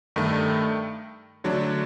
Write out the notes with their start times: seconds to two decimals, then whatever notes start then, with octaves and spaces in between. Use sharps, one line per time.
0.16 G2 D#3 A3
1.44 D3 F#3 A3 D4